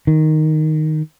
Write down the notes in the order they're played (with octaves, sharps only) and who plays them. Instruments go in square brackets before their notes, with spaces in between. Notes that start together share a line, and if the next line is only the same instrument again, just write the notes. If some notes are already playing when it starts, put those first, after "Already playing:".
[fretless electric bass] D#3